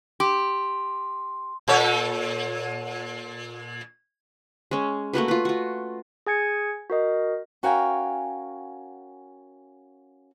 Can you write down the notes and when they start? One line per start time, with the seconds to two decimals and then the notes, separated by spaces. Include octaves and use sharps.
0.20 G4 C6
1.68 A#2 A4 C#5
4.71 G#3 C#4
5.13 A3 A#3 F#4 B4
5.28 F4 B4
5.45 F4 F#4
6.27 G#4 G#5 G#6 C#7
6.90 F#4 A#4 D#5
7.63 C#4 F#4 A#4 F5 G5 G#5